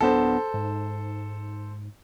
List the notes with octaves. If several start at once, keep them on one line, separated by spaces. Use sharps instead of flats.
D1 B3 D4 A4 C5
G#2